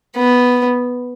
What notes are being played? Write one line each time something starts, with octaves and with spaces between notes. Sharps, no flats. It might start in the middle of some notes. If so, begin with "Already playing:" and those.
B3